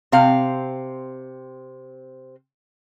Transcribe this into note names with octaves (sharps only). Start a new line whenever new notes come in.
C3 C4 F5